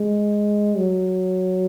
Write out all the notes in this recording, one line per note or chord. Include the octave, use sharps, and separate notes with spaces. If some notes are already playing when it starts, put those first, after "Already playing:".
Already playing: G#3
F#3